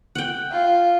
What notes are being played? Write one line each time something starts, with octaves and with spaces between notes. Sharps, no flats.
F#5 G5
F4